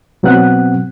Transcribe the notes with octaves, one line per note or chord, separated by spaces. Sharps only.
B2 F#3 B3 C4 F#5 F#6